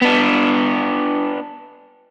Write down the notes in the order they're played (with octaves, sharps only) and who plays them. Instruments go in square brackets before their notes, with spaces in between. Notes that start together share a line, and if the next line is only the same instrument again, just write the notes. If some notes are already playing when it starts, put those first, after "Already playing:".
[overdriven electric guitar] B3 D4